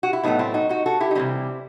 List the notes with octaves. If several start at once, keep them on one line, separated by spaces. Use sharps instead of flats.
F#4
E4
A2 F#3 A3 B3 D#4
C4 E4
D#4 F#4
D#4 F#4
F#4 A4
E4 G4
D#4
C3 E3 G3 C4 E4